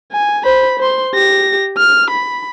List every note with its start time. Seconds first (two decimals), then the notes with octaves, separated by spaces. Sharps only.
0.12 G#5
0.44 C5 B5
0.79 C5 C6
1.14 G4 A#6
1.77 F6
2.10 B5